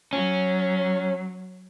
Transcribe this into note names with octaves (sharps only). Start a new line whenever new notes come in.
F#3 C#4